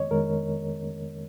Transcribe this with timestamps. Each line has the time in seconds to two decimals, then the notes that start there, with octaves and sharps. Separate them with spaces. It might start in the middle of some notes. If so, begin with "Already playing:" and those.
Already playing: F2 D#3 G#3 C#5 D#5
0.11 F2 D#3 G#3 A#4